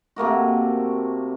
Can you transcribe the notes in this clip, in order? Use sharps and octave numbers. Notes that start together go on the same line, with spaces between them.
C3 A3 A#3 F#4